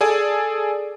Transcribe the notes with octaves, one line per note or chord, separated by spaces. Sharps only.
G#4 A4 D5 G#5